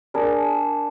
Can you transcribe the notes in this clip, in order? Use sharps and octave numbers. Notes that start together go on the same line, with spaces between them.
D4 G#4 A#4